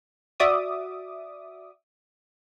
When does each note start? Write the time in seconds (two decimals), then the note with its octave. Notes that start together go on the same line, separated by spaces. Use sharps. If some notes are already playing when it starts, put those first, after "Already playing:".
0.40 F#4 D5 E5 D6 D#6